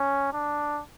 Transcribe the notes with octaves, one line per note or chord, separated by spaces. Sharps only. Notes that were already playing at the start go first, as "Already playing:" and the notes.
Already playing: C#4
D4